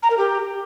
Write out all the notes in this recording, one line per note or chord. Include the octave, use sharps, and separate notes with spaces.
A#5
A#4
G4